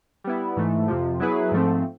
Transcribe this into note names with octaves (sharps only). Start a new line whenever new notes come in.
G3 B3 E4
G#2 E3 A3
F2 C3 F3
F#3 B3 E4 G#4 B4
G#2 F3 A3 C4